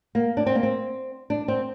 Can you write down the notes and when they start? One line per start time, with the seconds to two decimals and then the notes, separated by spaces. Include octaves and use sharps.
0.15 A#3
0.37 D4
0.46 C4
0.55 A#3
0.63 C4
1.30 D4
1.48 C4